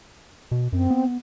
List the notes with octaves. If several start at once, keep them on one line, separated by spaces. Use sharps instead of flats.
B2
F#2 C4
B3